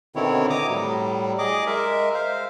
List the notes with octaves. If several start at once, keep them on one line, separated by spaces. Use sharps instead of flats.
B2 D3 D#3 C4 E4 C#5
A#5 D6 D#6
A2 F#3 G3
G#4 D#5 D6
G#3 A#4 E5
C5 F5